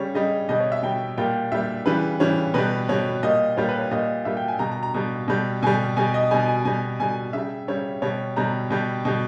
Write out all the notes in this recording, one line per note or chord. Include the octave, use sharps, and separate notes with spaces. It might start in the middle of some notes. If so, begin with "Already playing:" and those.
Already playing: C#3 G3 C#5
C#3 G3 D#5
B2 G3 D#5
C#5
E5
B2 G3 G5
A#2 G3 G5
A#2 G3 E5
C#3 E3 G3 B4
C#3 E3 G3 C#5
B2 G3 B4
B2 G3 C#5
A#2 G3 D#5
A#2 G3 C#5
B4
C#5
A#2 G3 D#5
A#2 G3 E5
G5
G#5
B2 G3 A#5
A#5
A#5
B2 G3
B2 G3
B2 G3 G#5
B2 G3 G#5
D#5
B2 G3 G#5
G#5
B2 G3 G#5
B2 G3 G#5
C#3 G3 E5
C#3 G3 C#5
B2 G3 C#5
B2 G3 A#5
B2 G3
B2 G3